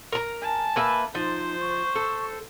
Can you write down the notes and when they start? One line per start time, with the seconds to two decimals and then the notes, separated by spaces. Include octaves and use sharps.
0.12 A#4 A#5
0.42 G#5 A5
0.76 A#3 B4 E5
1.15 F3 D#4 C5
1.60 C#6
1.95 A4